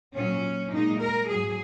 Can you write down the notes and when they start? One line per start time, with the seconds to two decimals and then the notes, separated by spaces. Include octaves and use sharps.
0.15 A#2 F#3 C#4
0.72 A#2 G#3 D#4
1.01 A#4
1.29 G#2 F#3 G#4